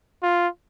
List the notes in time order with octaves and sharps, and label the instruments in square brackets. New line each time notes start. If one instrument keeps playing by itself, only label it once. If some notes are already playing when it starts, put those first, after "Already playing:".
[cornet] F4